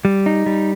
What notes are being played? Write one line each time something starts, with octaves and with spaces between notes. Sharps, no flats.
G3
D#4
G3